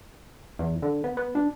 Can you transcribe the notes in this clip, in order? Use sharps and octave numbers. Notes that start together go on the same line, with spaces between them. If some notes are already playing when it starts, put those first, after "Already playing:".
E2
D3
B3
B3
D4